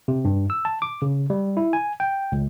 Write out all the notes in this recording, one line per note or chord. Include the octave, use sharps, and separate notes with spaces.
C3
G2
E6
A5
D6
C#3
G3
E4
G#5
G5
C#2